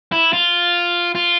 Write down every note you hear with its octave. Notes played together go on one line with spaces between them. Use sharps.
E4
F4
F4